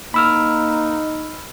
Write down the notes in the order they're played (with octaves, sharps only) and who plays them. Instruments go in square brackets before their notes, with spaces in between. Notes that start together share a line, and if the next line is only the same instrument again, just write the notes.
[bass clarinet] A#3 [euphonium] D#4 [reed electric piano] B5 E6 F6